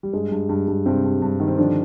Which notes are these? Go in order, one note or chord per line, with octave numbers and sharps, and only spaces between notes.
G3
G2 G#3
G2
G2
G2
G2 C3 C4
G2
G2
D#3
C4
D3 F3 D4